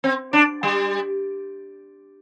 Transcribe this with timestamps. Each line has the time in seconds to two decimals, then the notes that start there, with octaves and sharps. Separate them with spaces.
0.04 C4
0.33 D4
0.63 G3